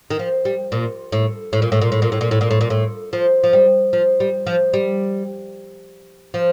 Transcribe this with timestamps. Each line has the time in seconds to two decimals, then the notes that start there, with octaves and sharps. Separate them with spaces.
0.11 D#3
0.19 F3
0.45 G3
0.72 A#2
1.12 A2
1.53 A2
1.62 A#2
1.72 A2
1.81 A#2
1.92 A2
2.02 A#2
2.12 A2
2.21 A#2
2.31 A2
2.41 A#2
2.51 A2
2.61 A#2
2.70 A2
3.13 F3
3.44 F3
3.53 G3
3.93 F3
4.20 G3
4.47 F3
4.74 G3
6.34 F3